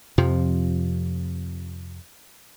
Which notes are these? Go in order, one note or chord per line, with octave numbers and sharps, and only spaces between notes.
F2 C3 F3